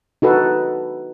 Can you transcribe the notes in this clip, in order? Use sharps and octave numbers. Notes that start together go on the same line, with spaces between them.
D#4 F#4 A4 B4